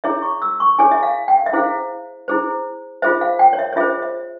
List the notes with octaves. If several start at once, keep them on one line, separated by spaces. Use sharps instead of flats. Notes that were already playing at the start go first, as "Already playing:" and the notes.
E4 G#4 C#5 E5
C#6
E6
C#6
E4 G#4 C#5 G#5
E5
F5
G5
F5
E5
E4 G#4 C5 F5
E4 G#4 C5
F4 G#4 C5 E5
F5
G5
C#5
E5
C#5
F4 G#4 C5 E5
E5